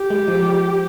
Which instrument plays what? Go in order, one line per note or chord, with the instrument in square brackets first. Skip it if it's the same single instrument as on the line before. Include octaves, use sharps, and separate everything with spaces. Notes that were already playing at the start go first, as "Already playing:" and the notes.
Already playing: [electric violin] G4
[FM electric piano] G#3
F3